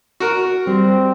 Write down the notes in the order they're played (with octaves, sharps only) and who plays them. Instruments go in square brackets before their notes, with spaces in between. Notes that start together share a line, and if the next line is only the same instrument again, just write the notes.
[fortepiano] F#4 A#4
[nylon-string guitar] G3 C5 [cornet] C4